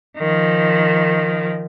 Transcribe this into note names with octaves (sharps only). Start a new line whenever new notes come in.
D#3 F3